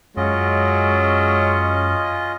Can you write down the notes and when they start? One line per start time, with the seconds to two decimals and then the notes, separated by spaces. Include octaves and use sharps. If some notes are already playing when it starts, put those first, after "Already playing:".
0.17 F#2 F#3 G#3 C#4 F4 D#5